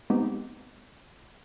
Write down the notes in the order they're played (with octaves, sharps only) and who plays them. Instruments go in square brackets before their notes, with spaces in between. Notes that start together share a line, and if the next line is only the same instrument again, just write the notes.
[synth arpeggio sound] G#3 B3 C4 D#4 G4